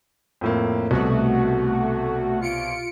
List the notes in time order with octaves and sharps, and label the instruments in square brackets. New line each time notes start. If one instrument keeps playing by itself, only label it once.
[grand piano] F2 A2 A#3
[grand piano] C2 B2 [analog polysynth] A3 F#4
[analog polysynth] F4 C#7 D7